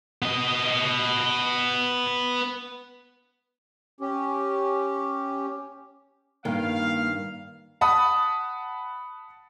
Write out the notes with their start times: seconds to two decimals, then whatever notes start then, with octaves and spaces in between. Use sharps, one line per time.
0.22 B3 D#5
4.01 C#4 G4
6.45 G2 D#3 A#3 B3 F5 G5
7.81 F#5 A5 B5 D#6